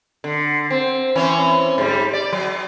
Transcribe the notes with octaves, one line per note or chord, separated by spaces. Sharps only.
D3
C4
E3 C4 C#4
G#2 G3
D5
F#3